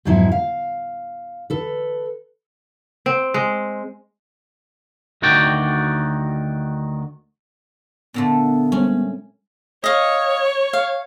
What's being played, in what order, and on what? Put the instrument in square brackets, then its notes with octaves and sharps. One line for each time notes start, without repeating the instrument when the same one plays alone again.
[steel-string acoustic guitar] F2 G#2 B2 F#3 G#3 E4
F5
A4 B4
[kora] C4
G#3
[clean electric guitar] D2 D#3 F#4 D5 G5
[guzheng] A#2 D3 A3 [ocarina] B3
[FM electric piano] G3 G#3 C4 [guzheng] C#4
[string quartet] C#5 [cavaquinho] D#5 F5
[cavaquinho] F5